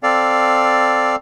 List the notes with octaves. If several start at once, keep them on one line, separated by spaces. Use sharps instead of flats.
C4 A4 D5 F5